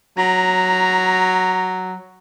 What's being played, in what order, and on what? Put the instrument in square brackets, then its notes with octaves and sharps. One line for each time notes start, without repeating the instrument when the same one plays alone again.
[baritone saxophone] F#3 [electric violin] A#5